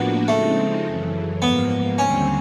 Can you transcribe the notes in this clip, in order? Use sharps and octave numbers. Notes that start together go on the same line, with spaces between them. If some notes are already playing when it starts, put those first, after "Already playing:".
Already playing: A2 F3 A#3 B3 D4 F#4
C#3 F3 G#3 A3 C4 D#4
F#2 C#3 E3
G#2 F3 A#3 B3
D#2 D3 G3 C4 C#4